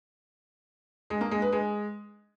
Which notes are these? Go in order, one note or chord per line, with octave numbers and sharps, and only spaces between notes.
G#3
A#3
G#3
B4
G#3